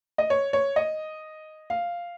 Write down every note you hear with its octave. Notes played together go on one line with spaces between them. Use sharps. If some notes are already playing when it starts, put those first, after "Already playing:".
D#5
C#5
C#5
D#5
F5